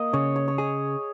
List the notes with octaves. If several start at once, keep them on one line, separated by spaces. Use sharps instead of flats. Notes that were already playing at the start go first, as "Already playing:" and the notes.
Already playing: A#3 D#5
C#3 C#5
C#5
C#5
G#4 D#5